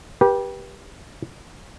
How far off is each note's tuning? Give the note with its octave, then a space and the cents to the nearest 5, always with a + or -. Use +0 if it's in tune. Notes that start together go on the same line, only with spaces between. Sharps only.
G4 +0 B4 -35